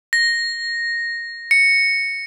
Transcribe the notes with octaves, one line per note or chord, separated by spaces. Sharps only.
A#6
C#7